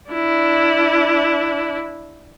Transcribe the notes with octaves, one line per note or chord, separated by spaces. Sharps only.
D4 E4